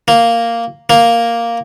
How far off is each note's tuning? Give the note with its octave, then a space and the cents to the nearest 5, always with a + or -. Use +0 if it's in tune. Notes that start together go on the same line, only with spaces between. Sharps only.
A#3 -5
A#3 +0